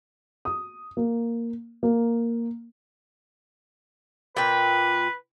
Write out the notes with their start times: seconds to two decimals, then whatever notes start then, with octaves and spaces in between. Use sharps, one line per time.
0.45 D#6
0.97 A#3
1.83 A#3
4.37 A#2 B4 G5